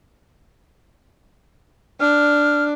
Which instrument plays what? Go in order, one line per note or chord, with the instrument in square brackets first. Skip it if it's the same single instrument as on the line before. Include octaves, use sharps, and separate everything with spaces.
[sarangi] D4 [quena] F6